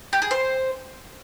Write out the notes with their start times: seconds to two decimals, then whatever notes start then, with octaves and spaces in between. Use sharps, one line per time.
0.13 G4
0.22 G#4
0.31 C5